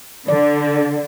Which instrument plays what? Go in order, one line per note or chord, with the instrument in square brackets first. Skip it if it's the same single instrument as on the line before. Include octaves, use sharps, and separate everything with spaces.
[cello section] D3 [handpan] D5